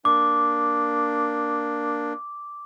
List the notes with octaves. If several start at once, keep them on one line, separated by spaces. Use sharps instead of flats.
A#3 D4 D6